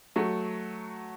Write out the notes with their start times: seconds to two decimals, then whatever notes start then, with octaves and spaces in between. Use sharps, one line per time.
0.16 F#3 A3